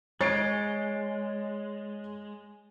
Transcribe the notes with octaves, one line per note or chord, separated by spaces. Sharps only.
G#3 C#5 A6 C7 D7